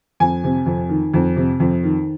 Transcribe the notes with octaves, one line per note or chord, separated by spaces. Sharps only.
F2 G#5
C3
F2
D#3
F2
C3
F2
D#3